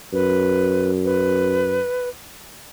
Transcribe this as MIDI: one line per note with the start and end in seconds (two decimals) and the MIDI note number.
0.13 1.80 42
0.13 0.91 71
1.05 2.09 71